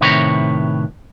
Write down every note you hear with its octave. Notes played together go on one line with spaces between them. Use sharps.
A2 C3 D#3 B4 C#5 A#5